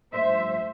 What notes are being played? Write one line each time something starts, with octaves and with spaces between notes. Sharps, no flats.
G2 F3 A3 C5 E5